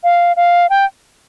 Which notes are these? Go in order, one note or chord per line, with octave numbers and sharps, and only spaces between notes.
F5
F5
G5